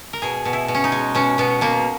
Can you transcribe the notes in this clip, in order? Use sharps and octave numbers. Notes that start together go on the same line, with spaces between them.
A#4
B2 G#4
B2
E4
B2
C#4
D#4
G#3
B2 C#4
B2 B3
B2 A#3